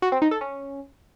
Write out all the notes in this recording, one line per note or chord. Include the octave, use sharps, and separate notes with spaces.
F#4
C4
D#4
A4
C#4